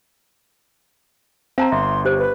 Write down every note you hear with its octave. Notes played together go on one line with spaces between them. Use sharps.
C4 F5 A5 A#5
G1 E5 C6
G4 C5
B4